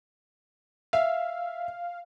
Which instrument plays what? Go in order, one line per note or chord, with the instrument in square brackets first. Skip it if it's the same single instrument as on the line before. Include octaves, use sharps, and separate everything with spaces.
[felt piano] E5 [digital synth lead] F5